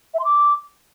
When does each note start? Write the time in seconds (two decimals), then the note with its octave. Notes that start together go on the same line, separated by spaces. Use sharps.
0.14 E5
0.19 C6
0.25 D6